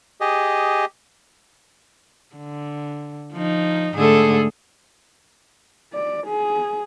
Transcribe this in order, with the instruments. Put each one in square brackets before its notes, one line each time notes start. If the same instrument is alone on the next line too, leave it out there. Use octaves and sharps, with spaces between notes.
[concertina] G4 G#4 D#5
[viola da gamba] D3
F3 D#4
[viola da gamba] G#2 D3 A3 [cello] G#4 A4
[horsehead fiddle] D5
G#4